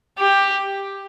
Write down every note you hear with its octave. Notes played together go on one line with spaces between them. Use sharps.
G4